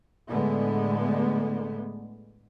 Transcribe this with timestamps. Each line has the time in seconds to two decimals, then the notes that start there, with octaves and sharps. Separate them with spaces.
0.29 A2 D3 G#3 A3 B3